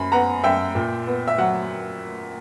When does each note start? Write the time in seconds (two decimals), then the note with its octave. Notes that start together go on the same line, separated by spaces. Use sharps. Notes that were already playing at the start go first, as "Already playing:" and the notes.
Already playing: F#2 B5
0.12 B3 F#5 A#5
0.44 F#2 E5 G5
0.75 A#2
1.07 B3
1.28 E5
1.38 F#3 F#5